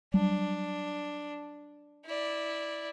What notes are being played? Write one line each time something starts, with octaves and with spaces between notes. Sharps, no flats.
F#3 G3 D4
E4 D5